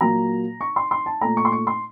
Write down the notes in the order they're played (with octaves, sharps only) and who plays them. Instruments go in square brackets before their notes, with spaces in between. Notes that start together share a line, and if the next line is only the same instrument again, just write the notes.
[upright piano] A#2 F#3 A#3 A#5
C#6
C6
C6
A5
A#2 A3 A#5
C#6
C6
C#6
C6